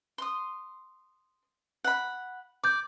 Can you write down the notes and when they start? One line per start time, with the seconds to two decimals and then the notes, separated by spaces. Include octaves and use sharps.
0.18 C6 D#6
1.84 F#5 B5
2.64 D5 D6 G6